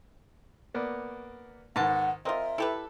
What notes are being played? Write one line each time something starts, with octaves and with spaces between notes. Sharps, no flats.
A#3 B3 D5
G#2 D#3 B3 F#5 A5
C4 F4 A#4 D#5 E5
E4 G4 A4 B4